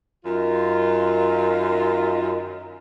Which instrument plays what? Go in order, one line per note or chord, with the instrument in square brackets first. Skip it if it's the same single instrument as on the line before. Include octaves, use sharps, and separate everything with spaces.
[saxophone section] F#2 D#3 F4